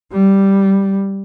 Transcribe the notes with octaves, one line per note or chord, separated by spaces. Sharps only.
G3